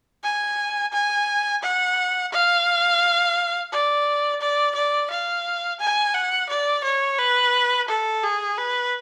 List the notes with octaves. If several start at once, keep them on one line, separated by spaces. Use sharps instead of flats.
G#5
G#5
F#5
F5
D5
D5
D5
F5
G#5
F#5
D5
C#5
B4
A4
G#4
B4